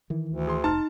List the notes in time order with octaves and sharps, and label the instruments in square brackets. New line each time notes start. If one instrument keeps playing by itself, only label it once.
[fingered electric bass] D#3 E3
[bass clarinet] D2
[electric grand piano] G#4 C6
[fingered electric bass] F1 [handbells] D#4 [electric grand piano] A5 C6 F6